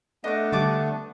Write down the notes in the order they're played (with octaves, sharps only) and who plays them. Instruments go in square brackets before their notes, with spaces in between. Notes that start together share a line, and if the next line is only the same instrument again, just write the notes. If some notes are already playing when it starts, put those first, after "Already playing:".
[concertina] A3 B3 D4 [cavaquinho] D#5 D6
[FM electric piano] D3 G3 [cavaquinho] A5 D6